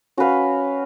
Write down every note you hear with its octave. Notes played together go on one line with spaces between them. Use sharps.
C#4 F#4 B4 F5